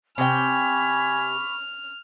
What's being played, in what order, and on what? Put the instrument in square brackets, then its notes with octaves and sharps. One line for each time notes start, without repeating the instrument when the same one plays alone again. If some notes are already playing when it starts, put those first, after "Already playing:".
[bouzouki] C3 G5 [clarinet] G#5 [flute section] B5 C#6 D6 [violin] F6